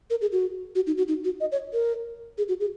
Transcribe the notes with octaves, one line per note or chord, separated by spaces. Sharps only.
A#4
G#4
F#4
F#4
D#4
F#4
D#4
F#4
D#5
C#5
A#4
G#4
F#4
G#4